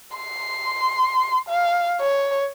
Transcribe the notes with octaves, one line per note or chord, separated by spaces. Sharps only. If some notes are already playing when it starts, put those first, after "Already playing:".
C6
F5
C#5